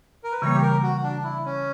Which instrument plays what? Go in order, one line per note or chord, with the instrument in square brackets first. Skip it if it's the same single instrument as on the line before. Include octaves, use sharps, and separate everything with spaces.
[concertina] A#4
B4
[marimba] C#3 E3 G3 A#3 [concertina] C#5
[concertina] G4
A#4
F#4
D4
E4
C#4